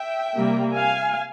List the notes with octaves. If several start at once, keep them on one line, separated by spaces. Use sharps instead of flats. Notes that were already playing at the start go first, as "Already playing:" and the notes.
Already playing: E5 G5
C3 G3 A#3
F5 G#5